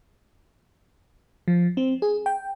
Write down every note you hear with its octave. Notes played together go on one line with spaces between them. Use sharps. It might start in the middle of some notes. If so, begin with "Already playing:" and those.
F3
C4
G#4
G5